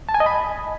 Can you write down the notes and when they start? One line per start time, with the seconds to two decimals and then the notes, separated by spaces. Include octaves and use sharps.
0.09 A5
0.14 G#5
0.20 D#5
0.26 B5